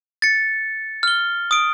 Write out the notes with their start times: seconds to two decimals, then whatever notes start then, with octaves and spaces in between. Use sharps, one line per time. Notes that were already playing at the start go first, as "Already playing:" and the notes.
0.22 A6 C#7
1.03 F6 G7
1.51 D#6 D7